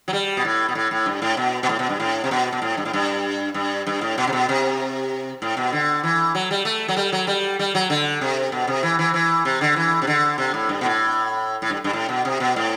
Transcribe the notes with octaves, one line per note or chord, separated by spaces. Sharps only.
F#3
G3
B2
A2
B2
A2
A2
G2
A2
B2
B2
A2
B2
G2
A2
C3
B2
B2
A2
G2
A2
G2
G2
G2
A2
B2
C3
B2
C3
A2
B2
D3
E3
F#3
G3
A3
F#3
G3
F#3
G3
G3
F#3
D3
C3
B2
C3
E3
E3
E3
C3
D3
E3
C3
D3
C3
A2
G2
B2
A2
A2
G2
G2
A2
B2
C3
B2
A2